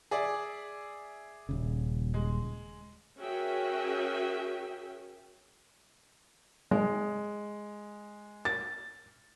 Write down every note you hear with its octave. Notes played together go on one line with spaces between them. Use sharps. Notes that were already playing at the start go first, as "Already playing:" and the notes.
G#4 D5 E5
D#1 C#3
G#3
C#4 F#4 G#4 A#4 E5 G5
G#3
A6